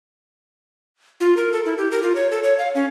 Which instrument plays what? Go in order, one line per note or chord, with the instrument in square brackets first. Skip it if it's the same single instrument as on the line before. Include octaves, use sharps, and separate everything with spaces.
[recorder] F4
A#4
A4
E4
G4
A#4
F4
C#5
A4
C#5
F5
C#4